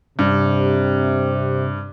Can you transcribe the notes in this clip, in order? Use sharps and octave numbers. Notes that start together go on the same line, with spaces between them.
G2 C3